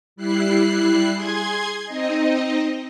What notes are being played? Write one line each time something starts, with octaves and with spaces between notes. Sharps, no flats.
G3 E4 F#6 C7
G#4 C6 G#6
C4 D#4 D#5